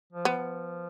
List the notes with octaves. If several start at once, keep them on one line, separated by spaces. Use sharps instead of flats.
F3
B3
F3